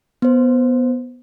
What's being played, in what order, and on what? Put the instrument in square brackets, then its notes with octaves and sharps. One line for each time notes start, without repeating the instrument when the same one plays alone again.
[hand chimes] B3 C5